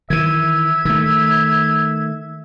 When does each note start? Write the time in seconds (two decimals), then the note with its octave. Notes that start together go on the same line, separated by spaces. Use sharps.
0.10 D#3 E3 E5 G#6
0.85 D#3 A3